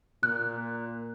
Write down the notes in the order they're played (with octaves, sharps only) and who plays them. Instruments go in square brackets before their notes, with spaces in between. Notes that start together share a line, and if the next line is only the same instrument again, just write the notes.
[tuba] A#2 [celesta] F#6